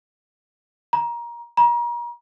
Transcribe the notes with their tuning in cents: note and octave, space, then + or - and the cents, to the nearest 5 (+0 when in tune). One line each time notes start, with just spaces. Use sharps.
A#5 +20
A#5 +35